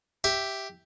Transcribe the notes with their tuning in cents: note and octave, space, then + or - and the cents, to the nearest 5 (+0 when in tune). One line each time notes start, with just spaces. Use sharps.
G4 -5 E5 +0